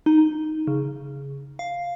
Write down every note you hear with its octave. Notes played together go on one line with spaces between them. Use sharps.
D#4
C#3
F5